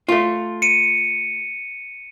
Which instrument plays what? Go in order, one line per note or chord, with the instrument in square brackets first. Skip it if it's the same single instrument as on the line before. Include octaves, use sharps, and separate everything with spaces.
[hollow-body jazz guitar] A3 F4
[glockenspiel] C#7 D#7